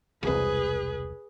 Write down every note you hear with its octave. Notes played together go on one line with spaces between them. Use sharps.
E1 C2 G#4 B4